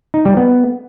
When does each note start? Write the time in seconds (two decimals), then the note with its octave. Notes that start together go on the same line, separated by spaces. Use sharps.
0.14 D#4
0.25 G3
0.37 B3